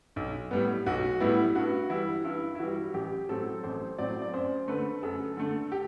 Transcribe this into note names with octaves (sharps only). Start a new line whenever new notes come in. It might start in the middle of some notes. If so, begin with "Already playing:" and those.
B1
A2 G3 B3
B1 F#4
A2 G3 B3 E4
G2 F#4
E3 G3 E4
G2 E4
E4
E3 G3 F#4
A1 G4
A2 F#3 C4 A4
A1 C5
A2 F#3 C4 D5
D5
F#2 C5
D3 A3 B4
F#2 A4
D3 A3
G4